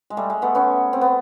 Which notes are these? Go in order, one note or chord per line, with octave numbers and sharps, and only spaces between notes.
G#3
G3 A3
G#3
A3 B3
B3 C#4
C4
B3